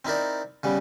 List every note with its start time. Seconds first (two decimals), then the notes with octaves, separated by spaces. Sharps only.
0.05 C4 D#4 E4 A#4 D5
0.63 C#3 G3 B3